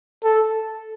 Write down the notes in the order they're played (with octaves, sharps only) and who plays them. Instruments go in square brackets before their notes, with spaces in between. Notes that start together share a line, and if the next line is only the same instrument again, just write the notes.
[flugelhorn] A4